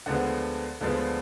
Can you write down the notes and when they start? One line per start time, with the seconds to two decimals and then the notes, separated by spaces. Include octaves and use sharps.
0.06 D2 D3 F3 G#3 B3 F#5
0.81 D2 D3 F3 G#3 B3